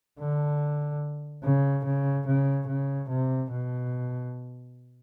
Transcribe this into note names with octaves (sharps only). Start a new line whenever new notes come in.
D3
C#3
C#3
C#3
C#3
C3
B2